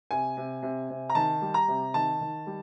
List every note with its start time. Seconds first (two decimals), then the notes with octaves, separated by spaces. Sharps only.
0.11 C3 G#5
0.37 C3
0.63 C3
0.90 C3
1.10 A#5
1.15 D#3 A5
1.42 G3
1.54 A#5
1.68 C3
1.94 D#3 A5
2.21 D#3
2.47 G3